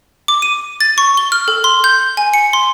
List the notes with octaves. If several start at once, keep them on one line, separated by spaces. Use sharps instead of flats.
D6
D#7
A6
C#6
G7
F6
A4
C6
G6
G#5
C#7
C6